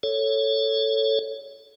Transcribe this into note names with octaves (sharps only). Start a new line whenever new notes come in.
A4 C#5